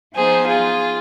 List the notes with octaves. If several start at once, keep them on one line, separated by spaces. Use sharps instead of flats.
F3 B3 D#4 G#4 C5
F4 G#4